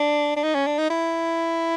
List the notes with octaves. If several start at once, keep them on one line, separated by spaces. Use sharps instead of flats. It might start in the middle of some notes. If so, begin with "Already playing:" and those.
Already playing: D4
D4
D#4
C#4
D4
D#4
E4